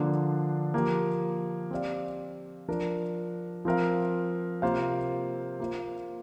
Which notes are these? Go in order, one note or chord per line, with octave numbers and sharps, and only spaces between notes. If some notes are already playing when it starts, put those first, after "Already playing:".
Already playing: D3 F3 A#3 D4
F3 A#3 G4 A#4
C4 G4 D5 F5
F3 D4 A#4
F3 C4 A#4 F5
C3 A#3 F4 C5 F5
A#3 F4 C5